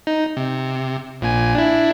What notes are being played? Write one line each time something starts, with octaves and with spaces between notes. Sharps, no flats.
D#4
C3
A#1 A#2 G#5
D4 E4